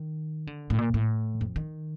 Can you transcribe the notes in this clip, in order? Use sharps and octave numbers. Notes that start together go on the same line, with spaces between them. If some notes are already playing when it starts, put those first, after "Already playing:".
Already playing: D#3
D3
A2
A#2
A2
F2
D#3